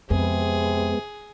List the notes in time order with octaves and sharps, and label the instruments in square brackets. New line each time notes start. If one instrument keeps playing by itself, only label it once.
[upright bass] F2 [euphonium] C3 [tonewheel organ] G#3 B3 [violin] G#4